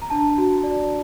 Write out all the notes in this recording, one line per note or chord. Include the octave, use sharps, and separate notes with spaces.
A#5
D4 A5
F#4
D5